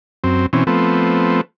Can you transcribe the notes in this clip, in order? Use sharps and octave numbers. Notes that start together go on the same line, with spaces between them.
F#2 C4
B2 E3 C4 C#4
F3 A3 B3 C4